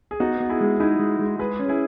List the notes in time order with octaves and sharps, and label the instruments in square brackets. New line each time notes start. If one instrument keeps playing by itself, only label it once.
[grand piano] G#4
[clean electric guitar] B3 [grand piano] D#4 F#4
[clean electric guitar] B3
[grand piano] E4 G#4
[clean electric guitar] G#3
[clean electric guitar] D#4 [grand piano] E4 G#4
[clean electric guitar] G#3
G#3
[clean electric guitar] G#3 [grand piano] G#4 B4
[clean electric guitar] C#4
[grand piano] E4 G#4